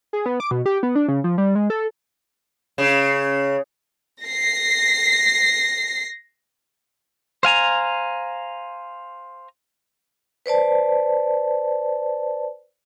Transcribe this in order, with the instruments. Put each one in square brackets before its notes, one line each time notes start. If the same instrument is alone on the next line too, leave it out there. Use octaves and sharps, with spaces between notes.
[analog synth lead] G#4
B3
D6
B2
G4
B3
D4
C#3
F3
G3
G#3
A4
[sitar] C#3
[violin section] A#6 C7
[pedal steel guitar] C5 F5 G#5 A#5
[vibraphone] B4 C5 D5 A5